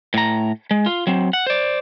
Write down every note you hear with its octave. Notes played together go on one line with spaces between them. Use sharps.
A2 A#5
G#3
F4
F#3 C4
F#5
C5 D5